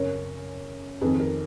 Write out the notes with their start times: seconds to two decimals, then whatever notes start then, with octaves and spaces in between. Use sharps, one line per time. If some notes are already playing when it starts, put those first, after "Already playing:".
Already playing: F#2 C#3 A#4 C#5
1.01 F2 D#3 G#4 B4
1.20 A#4